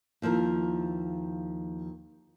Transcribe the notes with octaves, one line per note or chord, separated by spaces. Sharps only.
D#2 F3 E4 A#4